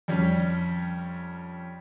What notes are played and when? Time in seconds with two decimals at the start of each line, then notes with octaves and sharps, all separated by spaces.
0.08 F2 G3 C#4